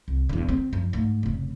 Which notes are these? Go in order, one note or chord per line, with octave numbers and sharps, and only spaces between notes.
C2
E2 D3
D3 C4
F#2 F3
G#2 A3
F1 C#3